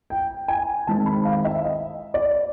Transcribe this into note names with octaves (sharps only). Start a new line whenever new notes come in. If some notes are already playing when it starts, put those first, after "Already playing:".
G5
G#5
D#3 G#3 C4 A5
B5
F5
E5
D#5
D5